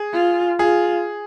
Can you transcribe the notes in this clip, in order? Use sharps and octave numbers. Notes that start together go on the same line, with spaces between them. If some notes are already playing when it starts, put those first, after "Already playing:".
Already playing: G#4
F4
F4 G#4